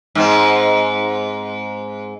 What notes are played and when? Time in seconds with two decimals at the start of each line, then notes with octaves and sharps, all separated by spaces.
0.15 G#2 C4